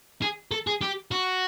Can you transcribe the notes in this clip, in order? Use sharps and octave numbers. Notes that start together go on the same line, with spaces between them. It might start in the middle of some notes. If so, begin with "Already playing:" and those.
G#4
A4
G#4
G4
F#4